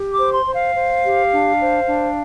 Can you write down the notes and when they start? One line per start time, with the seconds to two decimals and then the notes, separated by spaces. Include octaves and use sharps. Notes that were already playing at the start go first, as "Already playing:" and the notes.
Already playing: G4
0.12 D6
0.18 C5
0.33 C6
0.47 C5
0.54 F5
0.76 C5
1.04 G4
1.33 D4
1.60 C5
1.89 D4